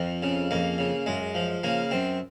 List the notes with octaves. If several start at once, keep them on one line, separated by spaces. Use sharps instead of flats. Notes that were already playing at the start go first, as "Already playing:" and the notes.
Already playing: F2 C4
C#3
F2 A#3
C#3
F#2 G#3
F3
C#3 A#3
F#2 C4